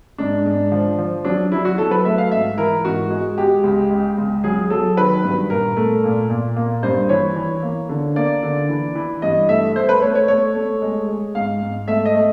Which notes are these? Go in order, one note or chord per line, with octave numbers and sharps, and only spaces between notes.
G#2 D4
G#2
F3
F3
F#3 D4
F#3 E4
F#4
F#3 A4
B4
A3 E5
F5
G#2 E5
E3 A#4
G#2 F#4
G#3
G#3 G4
C#2
G#3
C#2
F#3 G#4
F#3 A4
D#3 B4
G2
A#2 A#4
A3
A#2
A#2
A#3
G2 C5
E3 C#5
E3
A#3
D3
A#3 D5
D3
E3
E3
G2 D#5
A3 E5
A3 C5
B4
A3 C#5
C#5
A3 C#5
A3
G#3
G#3
G#2 F5
G#2
A3 E5
D#5
A3